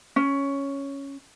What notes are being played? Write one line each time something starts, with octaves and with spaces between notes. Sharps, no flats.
C#4